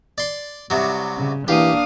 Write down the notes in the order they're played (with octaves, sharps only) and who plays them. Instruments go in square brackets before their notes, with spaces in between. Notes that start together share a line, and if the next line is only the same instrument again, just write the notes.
[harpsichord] D5 C6
C2 C3 F#3
[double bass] C#3
[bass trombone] E3 [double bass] A#3 D4 [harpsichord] G4 [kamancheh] F5 D#6